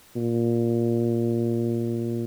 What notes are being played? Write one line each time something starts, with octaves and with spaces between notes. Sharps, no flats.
A#2